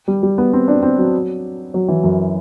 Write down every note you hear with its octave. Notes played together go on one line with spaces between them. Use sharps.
G3
G3
B3
C4
D4
C4
F#3
F#3
E3
F#2